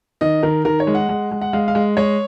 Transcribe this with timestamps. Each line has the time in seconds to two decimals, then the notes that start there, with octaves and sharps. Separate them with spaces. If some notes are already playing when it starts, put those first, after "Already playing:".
0.21 D#3 D#5
0.43 D#3 A#4
0.65 D#3 A#4
0.80 C#5
0.87 G#3
0.95 F#5
1.09 G#3
1.31 G#3
1.41 F#5
1.53 G#3 F5
1.68 F5
1.75 G#3
1.97 G#3 C#5